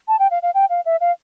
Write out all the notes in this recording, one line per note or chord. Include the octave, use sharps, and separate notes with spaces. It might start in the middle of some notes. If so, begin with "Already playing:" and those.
A5
G5
F5
F5
G5
F5
E5
F5